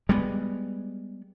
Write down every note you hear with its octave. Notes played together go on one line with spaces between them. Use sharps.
G3 G#3 B3